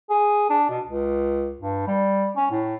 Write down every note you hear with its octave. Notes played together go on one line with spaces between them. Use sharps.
G#4
D4
B2
C#2
G2
G3
C#4
A2